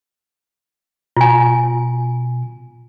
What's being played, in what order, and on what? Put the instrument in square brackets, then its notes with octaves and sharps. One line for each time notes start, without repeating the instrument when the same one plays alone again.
[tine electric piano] B2 [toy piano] F4 G#5